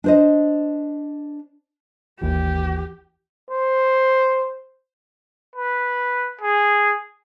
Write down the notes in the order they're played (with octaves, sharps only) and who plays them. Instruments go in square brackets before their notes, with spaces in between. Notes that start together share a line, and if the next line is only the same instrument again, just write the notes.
[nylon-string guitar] D4 C5 D#5
[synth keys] G#1 D#2 E3 [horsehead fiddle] G4
[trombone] C5
[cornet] B4
G#4